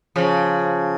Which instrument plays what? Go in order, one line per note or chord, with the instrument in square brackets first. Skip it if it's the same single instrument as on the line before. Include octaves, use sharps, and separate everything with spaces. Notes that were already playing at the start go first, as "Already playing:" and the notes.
[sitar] C#3 F3